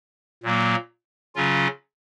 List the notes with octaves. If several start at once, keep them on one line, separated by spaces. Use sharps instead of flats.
A#2 F#3 A#3
C#3 F#3 C#4 F4